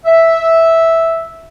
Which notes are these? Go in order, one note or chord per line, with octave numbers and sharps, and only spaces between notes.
E5